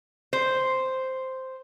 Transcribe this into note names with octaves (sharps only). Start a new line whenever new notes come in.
C5